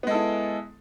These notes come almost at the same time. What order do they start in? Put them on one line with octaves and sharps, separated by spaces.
B3 G#3 A4 E4